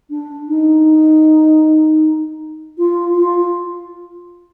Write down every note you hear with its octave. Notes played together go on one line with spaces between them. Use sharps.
D4
D#4
F4
F4